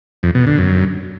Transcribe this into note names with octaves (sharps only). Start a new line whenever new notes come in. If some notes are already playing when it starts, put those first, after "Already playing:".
F2
B2
D3
F#2